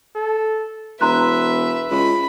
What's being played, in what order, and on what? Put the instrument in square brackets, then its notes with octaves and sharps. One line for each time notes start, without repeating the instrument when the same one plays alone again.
[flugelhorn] A4
[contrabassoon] E1 [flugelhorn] B4 [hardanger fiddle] E5 [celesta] A#5 C6 F#6
[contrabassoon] C#2 [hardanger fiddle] B5